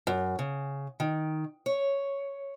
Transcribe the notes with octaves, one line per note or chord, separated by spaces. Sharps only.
F#2
C#3
D#3
C#5